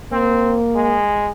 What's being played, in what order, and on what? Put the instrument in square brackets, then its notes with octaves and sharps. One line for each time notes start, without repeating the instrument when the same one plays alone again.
[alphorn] A#3 [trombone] C4
[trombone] G#3